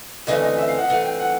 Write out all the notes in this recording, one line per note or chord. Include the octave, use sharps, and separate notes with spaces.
D2 C#3 E3 A3 C4 D#5
D#5
E5
F5
F#5
G2 E3 A3 C4 F#5
G5
F#5